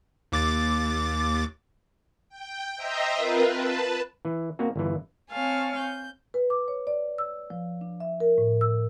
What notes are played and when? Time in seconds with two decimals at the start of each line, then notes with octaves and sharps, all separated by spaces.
0.32 D#2 D6 A6
2.29 G5
2.77 C5 D#5 E5 G5 A#5
3.16 C4 F4 A#4 B4
3.48 B4 A5
4.25 E3
4.59 A#3 C4 F#4
4.76 G1 E3
5.31 C4 C#5 F5 G#5 A5
5.78 G6
6.34 B4
6.50 D6
6.68 C#5
6.87 D5
7.18 E6
7.50 F3
7.81 D4
8.00 E5
8.20 A#4
8.38 A2
8.61 E6